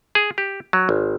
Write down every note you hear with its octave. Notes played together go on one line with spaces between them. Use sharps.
G#4
G4
F#3
G#1